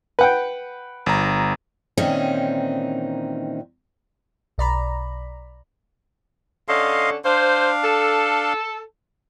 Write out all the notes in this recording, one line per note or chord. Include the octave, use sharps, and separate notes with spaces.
B4 F#5 G5
G1 A#5
A#2 D#3 E3 C4 C#4 D#4
B1 D5 A#5 B5
D3 C#4 A4 D#5 F5 C6
D4 C5 F5
A4